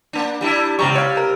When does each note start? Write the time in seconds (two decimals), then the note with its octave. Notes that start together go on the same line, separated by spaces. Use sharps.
0.13 A#3 D4
0.41 G3 D4 E4
0.79 C#2 C3 G3 A#5 C#6
0.95 C#5 F5
1.17 A#4